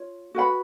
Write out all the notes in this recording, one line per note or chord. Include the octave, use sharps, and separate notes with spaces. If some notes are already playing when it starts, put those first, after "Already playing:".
Already playing: F4 C#5
F#4 B4 F#5 B5